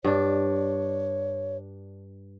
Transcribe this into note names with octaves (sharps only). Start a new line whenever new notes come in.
G2 D4 C#5